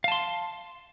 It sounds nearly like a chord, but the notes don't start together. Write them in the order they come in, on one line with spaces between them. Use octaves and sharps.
F5 A5 C6